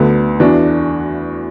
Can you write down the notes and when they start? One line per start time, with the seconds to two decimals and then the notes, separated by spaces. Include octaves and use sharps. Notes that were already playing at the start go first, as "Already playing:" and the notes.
Already playing: D2 D3 B3
0.40 E2 E3 D4 F#4